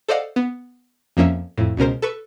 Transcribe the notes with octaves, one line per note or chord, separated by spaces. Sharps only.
A4 C5 D5 D#5 F5 F#5
B3
F2 F3 A#3 C#4 E5
F2 A2
C#2 B2 C#4 A#4 C5
A4 B4 C#6